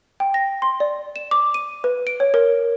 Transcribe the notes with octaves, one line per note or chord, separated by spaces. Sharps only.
G5
A#6
C6
D5
E7
D6
D#7
B4
D7
C#5
A#4